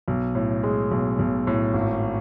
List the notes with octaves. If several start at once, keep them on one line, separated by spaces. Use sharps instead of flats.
B1
A2
G#3
B1
B1
A2
G#1